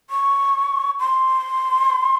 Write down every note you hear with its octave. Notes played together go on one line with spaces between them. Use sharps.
C#6
C6